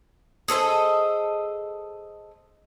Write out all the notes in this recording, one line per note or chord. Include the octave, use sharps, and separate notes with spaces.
G#4 A4 C5 D#5